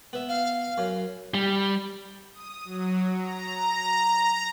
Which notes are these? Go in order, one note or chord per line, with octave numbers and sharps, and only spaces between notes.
B3 E5
F5
F#2
G3
D#6
F#3
A#5